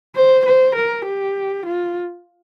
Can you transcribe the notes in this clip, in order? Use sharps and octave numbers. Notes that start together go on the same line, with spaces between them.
C5
C5
A#4
G4
F4